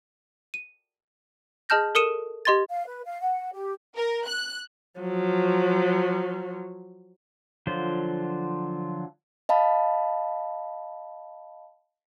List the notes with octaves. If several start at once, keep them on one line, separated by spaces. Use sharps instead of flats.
D#7
G#4 D#5 A5 F6 G6 A#6
A4 A#4 D#6 C#7 D#7 E7
G4 D#5 C6 G#6 A6
F5
B4
F5
F#5
G4
A#4
F#6
F3 F#3
D3 F3 F#3 F4 C5
D#5 F5 A5 B5